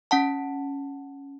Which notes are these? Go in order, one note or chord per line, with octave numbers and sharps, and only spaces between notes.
C#4 F#5 A5